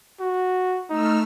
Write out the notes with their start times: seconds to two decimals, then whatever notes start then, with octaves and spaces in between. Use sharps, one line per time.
0.20 F#4
0.90 A3 D#4 E6 F6